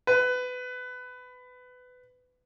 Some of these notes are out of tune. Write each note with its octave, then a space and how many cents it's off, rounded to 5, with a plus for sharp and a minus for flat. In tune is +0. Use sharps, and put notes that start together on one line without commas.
B4 +20